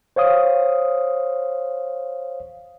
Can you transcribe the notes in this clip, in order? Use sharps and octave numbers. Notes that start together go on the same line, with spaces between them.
C5 C#5 F5 D#6